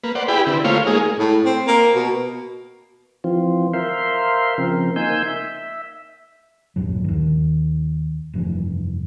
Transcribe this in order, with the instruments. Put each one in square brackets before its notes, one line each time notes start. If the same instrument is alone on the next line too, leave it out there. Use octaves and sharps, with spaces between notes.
[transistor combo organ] A#3 B4
C5 D5 F#5
E4 G4 G#4 B4 G5 B5
D3 C4 E4
A3 A#3 F4 C5 C#5 F5
G#3 A#3 D#4 G#4
[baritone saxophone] A2
C4
A#3
B2
[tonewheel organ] E3 F3 C4 F4
A#4 C5 E5 F5 C6
C#3 F3 C4 A#4
A#3 D#4 G#5 C6 E6 G6
E5
[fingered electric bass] E1 A#1 G2 F#3
D#2 D#3
F1 G2 E3